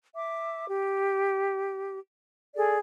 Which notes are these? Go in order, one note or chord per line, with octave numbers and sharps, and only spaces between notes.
E5 D6
G4
G#4 A4 D5